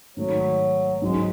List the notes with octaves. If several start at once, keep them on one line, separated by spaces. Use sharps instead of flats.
G#2 D#3 F#3 A3
G#2 F#3 G#3 C#4